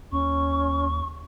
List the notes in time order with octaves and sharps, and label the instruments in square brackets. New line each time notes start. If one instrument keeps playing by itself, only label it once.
[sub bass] D#2 [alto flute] C#4 [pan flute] C#6